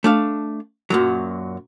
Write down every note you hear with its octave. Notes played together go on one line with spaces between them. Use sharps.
A3 D4 F5
F#2 A#2 F#3